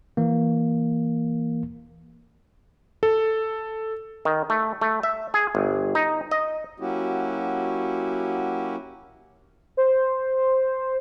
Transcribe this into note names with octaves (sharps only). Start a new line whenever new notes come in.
E3 A#3
A4
D#3
A3
A3
E5
G#4
G1
D#4
D#5
F#3 A#3 C#4 E4 F#4 G4
C5